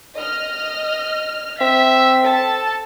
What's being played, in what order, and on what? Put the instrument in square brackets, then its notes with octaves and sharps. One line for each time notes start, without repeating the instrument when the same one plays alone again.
[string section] D#5 F6
[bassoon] C4 [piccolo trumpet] E5 [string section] B6
[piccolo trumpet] A4 [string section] A5